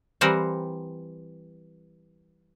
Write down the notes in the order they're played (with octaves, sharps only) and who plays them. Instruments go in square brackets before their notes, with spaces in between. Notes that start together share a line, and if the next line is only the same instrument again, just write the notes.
[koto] E3 G3 C4 A#4 C5 F#5